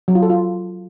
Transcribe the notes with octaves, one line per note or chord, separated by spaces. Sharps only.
F#3
F4
A4
F4